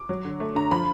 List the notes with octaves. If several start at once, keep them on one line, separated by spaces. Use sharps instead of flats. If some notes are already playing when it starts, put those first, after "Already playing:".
Already playing: D6
F#3
D3
A3
D3 A#5
F3 B5